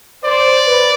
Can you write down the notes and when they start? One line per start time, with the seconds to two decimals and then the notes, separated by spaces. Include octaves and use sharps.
0.24 C5 D5
0.65 B4